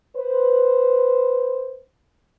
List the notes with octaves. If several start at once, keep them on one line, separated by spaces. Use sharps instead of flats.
B4 C5